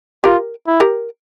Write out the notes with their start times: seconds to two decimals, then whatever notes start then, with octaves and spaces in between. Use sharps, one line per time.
0.24 F4 G4 A#4
0.67 E4
0.80 G4 A#4